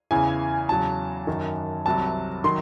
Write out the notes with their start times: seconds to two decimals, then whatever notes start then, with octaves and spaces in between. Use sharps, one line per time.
0.11 E2 C#3 E3 G#5
0.69 E2 C#3 F#3 A5
1.27 F#2 D#3 F#3
1.86 C2 C3 F#3 A5
2.44 D#3 F#3 C6